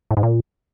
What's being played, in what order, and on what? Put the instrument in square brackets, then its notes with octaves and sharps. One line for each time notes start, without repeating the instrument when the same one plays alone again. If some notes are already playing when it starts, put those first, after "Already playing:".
[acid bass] A2
G#2
A#2